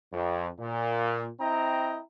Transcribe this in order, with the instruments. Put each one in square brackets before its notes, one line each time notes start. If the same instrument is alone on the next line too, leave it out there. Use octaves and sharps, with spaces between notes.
[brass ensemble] F2
A#2
C4 E4 D#5 G5 A#5